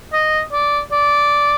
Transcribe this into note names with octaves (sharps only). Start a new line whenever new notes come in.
D#5
D5
D5